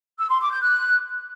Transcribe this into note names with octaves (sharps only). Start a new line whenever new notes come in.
E6
C6
D6
G6
F#6